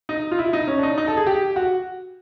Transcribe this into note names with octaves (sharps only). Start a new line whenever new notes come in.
D#4
F4
E4
D#4
C#4
D4
D#4
D#4
A4
G#4
G4
F#4